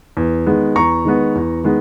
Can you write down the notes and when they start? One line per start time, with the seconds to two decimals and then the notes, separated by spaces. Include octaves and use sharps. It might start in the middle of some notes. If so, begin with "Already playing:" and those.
0.17 E2
0.46 D#3 G#3 B3
0.75 E2 A#5 C#6
1.05 D#3 G#3 B3
1.35 E2
1.64 D#3 G#3 B3